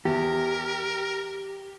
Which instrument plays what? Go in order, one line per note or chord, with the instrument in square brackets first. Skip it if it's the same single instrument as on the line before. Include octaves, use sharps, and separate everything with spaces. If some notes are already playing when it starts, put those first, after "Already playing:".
[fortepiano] E2 [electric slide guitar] G4 [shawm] A#4